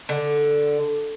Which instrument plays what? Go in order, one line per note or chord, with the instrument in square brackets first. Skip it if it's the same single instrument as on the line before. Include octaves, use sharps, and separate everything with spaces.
[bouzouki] D3